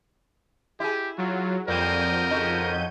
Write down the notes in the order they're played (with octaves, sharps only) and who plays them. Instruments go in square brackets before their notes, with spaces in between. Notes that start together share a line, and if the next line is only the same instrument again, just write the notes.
[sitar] E4 G#4 [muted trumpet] G4
[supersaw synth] F#3 [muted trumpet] F4
[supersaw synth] F2 G6 D#7 [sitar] F#3 G3 A#3 [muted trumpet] A#4
[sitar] C#3 D#4 F#4